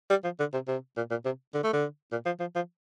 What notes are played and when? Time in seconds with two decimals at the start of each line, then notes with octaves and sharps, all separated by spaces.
0.10 G3
0.24 F3
0.39 D3
0.53 C3
0.68 C3
0.97 A#2
1.10 A#2
1.25 C3
1.54 D3
1.64 A3
1.73 D3
2.12 A#2
2.26 F3
2.40 F3
2.56 F3